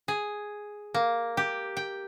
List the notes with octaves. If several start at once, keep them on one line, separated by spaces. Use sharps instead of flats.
G#4
A#3
G4
G5